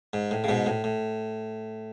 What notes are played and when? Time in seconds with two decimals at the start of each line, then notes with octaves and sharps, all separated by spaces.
0.13 G#2
0.31 A2
0.44 C#3
0.49 G#2 B2
0.66 A2
0.84 A2